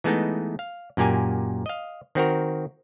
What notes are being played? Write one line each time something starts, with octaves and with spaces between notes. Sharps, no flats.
E3 G#3 A3 B3 D#4
F5
F#2 A#2 A#3 G4 G#5
D#5 F5
D#3 C4 F#4 A#4